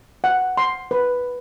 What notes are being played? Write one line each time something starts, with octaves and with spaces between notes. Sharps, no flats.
F#5
C6
B4